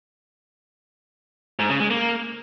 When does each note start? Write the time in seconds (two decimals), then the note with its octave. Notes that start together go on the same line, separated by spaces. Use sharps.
1.59 G#2
1.70 C#3
1.80 G#3
1.90 A#3